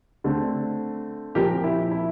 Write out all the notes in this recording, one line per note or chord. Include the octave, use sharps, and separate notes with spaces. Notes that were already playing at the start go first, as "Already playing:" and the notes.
D3 A3 C4
A#2 F3 C4 G4 A#4
E4
E4